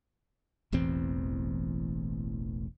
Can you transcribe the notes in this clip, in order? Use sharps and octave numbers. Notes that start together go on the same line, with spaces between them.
E1 A1 E2 C4